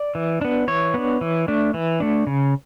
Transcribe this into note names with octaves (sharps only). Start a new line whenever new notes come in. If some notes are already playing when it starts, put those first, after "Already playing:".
Already playing: D5
E3
B3 D4
E3 C#5
B3 D4
E3
A3 D4
E3
A3 D4
C#3